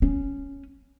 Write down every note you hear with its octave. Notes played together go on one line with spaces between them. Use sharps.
C#4